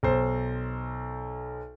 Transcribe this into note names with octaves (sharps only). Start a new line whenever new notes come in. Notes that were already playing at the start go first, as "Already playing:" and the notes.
B1 C5